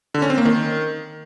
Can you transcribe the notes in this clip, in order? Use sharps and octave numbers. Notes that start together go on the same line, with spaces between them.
D3
C#4
C4
A#3
D#3